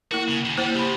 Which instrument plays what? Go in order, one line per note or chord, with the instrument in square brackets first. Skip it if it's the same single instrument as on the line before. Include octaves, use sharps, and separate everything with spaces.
[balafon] A#3 E4 A#4 [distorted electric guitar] F#4
[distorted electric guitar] C#3
D#2 C#3
[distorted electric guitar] G3 [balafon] A#3 E4 C5
[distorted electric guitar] C#3 F3 [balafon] G4 B5